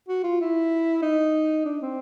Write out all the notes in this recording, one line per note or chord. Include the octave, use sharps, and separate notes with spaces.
F#4
F4
E4
D#4
D4
C4